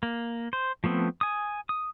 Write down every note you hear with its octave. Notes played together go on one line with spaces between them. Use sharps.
A#3
C5
F3 A3 B3 C4
G#5 D#6
D#6